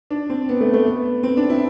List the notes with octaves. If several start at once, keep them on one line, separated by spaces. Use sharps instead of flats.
D4
C4
B3
A3
A3
B3
C4
D4
E4